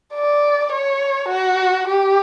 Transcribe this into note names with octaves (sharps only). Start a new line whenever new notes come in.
D5
C#5
F#4
G4